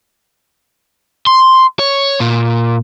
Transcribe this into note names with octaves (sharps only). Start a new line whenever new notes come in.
C6
C#5
A#2